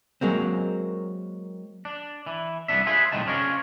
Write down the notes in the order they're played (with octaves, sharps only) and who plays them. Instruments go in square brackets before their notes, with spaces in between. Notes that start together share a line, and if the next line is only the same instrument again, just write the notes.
[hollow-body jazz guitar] F#3 G#3 A#3 C4
[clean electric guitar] D4
E3
C2 G#2 B3 D4 E5
F4 G#4 B4 C5 E5
B1 A2 F3 C4 D#4 A5
C#3 F3 C#4 D4 A#4